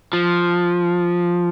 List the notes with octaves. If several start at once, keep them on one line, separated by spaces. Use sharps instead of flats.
F3